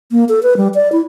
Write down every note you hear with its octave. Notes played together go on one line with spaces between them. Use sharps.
A#3
A4
B4
G3
D5
E4